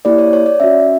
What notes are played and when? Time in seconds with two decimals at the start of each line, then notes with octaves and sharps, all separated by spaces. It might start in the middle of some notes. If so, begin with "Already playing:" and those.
0.05 A#3 E4 G4 D5
0.18 C#5
0.33 C#5
0.46 D5
0.60 C#4 F#4 E5